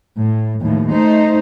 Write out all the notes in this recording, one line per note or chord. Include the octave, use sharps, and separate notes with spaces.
A2
D#2 A2 F3
A3 D#4 C5